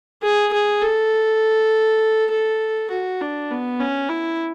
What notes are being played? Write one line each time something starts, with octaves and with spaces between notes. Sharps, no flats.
G#4
G#4
A4
A4
F#4
D4
B3
C#4
E4